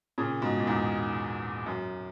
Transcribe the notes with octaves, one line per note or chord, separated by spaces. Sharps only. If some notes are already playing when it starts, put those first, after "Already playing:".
A#2 C#3
G#2 B2
A#2
E2 G#2
F#2